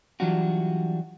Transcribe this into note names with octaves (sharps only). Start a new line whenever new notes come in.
E3 F#3 G3 D4 F4 F#4